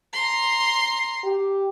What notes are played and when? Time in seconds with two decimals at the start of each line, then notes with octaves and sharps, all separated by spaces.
0.13 A#5 C6
1.24 G4